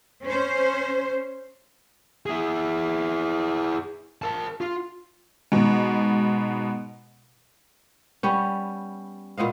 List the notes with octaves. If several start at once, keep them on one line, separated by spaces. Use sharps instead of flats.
C#4 C5
E4 G#4
A#4 A5
F4
G#2 B2
G3 B3 C#4
A#2 B3 D#5 F5